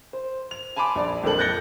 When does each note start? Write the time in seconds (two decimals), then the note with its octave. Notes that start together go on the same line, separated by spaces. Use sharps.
0.13 C5
0.51 F7
0.76 G#5 A5 B5 C6 D6
0.95 A#1 D5
1.23 A#1 F2 A#2 F3 A4 F#7
1.39 F#6 G6 A6 A#6 C#7 G7